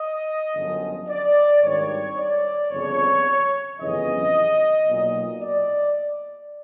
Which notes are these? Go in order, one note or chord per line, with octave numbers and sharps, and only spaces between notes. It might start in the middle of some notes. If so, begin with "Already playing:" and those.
Already playing: D#5
G1 F#2 D3 F3
D5
G#1 G2 D#3 C#5
D5
G1 F2 C#3 F3 C#5
G1 F2 C#3 E3 D#5
B1 A#2 F#3
D5